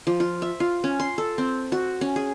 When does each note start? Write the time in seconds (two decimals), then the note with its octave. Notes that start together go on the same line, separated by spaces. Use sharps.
0.07 F3
0.20 F4
0.42 E5
0.60 F4
0.84 C#4
1.00 C6
1.18 A4
1.38 C4
1.72 F#4
2.01 C#4
2.16 G#4